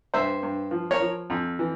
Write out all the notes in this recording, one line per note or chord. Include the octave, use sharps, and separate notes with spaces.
G2 C5 E5
G2
F3
A#4 C#5
F3
F2
E3